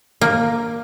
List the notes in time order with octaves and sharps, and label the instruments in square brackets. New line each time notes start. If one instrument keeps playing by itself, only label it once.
[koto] A#3